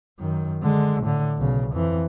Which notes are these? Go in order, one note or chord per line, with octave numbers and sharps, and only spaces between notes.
F#2 D#3
D3 G#3
A2 D3
B1 C#3
F2 E3